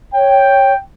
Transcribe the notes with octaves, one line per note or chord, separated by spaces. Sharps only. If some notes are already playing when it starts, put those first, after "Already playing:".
C#5 G5